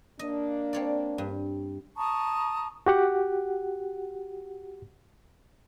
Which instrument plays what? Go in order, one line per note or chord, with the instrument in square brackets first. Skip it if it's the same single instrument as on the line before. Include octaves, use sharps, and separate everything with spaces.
[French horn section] A#3 D4 [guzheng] D#5
[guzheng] C4 C#5 D5
G2
[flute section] A5 A#5 C#6 D#6
[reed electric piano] F#4 G4 F#5